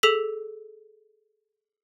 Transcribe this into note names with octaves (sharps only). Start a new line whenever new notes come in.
G#4 A4 E6 B6 F#7